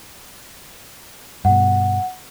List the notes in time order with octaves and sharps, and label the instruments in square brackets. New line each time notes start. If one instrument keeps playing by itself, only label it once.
[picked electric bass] G2 B2 [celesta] F#5